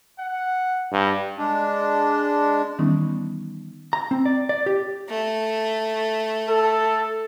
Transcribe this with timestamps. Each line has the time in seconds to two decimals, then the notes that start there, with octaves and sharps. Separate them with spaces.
0.19 F#5
0.92 G2
1.38 G#3 D4
2.79 D#3 E3 G3 B3 C#4 D#4
3.93 A#5
4.11 C4
4.26 D5
4.49 D5
4.66 G4
5.09 A3
6.49 A4